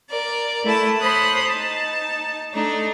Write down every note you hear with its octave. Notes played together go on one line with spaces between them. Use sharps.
A#4 D5
A3 E4 A5
C5 C#5 B5 D#6 F#6
D#4 A5
A3 D4 D#4